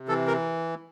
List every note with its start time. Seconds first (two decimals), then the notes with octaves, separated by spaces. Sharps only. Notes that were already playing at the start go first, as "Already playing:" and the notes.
Already playing: C3
0.08 E3 A4
0.27 A#4